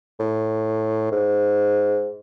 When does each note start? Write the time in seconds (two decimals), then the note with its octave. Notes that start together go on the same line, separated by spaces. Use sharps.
0.19 A2
1.12 G#2